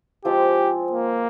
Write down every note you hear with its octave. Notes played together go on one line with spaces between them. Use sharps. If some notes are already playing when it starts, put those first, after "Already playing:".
F3 G#3 C4 F4 G4
A#3